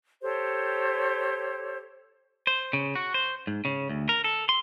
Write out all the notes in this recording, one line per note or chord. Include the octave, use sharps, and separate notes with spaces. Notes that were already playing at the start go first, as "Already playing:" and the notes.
G4 A4 C5 C#5
C5
C#3
F#4
C5
G#2
C#3
D2
A#4
A4
C6